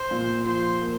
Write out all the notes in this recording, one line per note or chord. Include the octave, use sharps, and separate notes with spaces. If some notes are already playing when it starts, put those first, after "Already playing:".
Already playing: C5
A#2
F3 C5
A#3